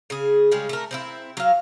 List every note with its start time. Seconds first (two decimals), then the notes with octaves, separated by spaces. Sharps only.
0.10 C#3 G#4
0.51 C#3 G3 G#3 C#4
0.69 A3 A#4
0.91 C4 D#4 E4
1.37 F#3 F5